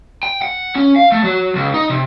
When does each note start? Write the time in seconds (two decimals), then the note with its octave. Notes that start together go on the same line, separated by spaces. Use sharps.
0.23 G5
0.42 F#5
0.76 C#4
0.96 F5
1.12 A3
1.24 F#3
1.56 C#2
1.74 D#4
1.90 C3